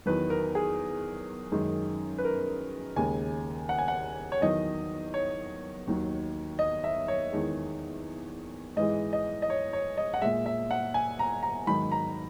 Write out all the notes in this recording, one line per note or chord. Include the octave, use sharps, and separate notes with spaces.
E2 D#3 F#3 B4
A#4
G#4
F#2 D#3 G#3
B4
A#4
D#2 C#3 G#3 G#5
F#5
G#5
F#5
C#5
E2 D#3 F#3 D#5
C#5
D#2 D#3 F#3
D#5
E5
C#5
E2 D#3 G#3
G#2 E3 G#3 D#5
D#5
D#5
C#5
C#5
D#5
F#5
A#2 G#3 E5
E5
F#5
G#5
A#5
A#5
G#2 D#3 F#3 B5
A#5